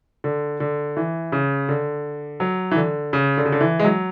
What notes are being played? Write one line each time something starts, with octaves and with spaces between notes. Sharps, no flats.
D3
D3
E3
C#3
D3
F#3
E3
D3
C#3
D3
C#3
D3
E3
G#3
F#3